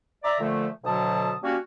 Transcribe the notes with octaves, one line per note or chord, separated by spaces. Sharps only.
D5 E5 A#5
A#2 D3 F3 A3
D2 B2 D3 F#3 A5 D#6
G3 A#3 C#4 F#4